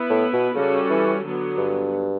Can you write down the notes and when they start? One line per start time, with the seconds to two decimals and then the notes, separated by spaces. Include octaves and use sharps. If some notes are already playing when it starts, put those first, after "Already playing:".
Already playing: B3 E4 B4
0.10 A2
0.33 B2
0.56 C#3 G3 C#4 F#4 A4
0.90 E3
1.24 D3 F#3 B3
1.58 G2